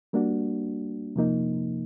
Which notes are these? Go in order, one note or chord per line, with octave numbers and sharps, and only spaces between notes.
G3 A#3 D4 F#4
C3 F3 A#3 D#4